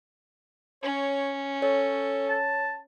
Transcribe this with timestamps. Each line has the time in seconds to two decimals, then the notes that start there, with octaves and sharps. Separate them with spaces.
0.83 C#4 C#5
1.62 A4 C#5
2.28 A5